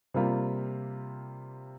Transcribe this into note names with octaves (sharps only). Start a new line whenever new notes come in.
C3 G3 A#3 F4